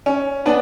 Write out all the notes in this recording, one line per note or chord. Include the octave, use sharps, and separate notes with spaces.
C#4
B3 D4